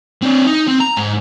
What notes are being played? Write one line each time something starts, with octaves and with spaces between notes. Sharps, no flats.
C4 D4
D#4
C4
A#5
G#2